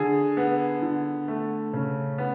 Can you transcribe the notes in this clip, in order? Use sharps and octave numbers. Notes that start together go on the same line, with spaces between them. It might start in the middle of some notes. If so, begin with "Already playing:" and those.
Already playing: D3 G#4
B3
D3
A3
C#3
B3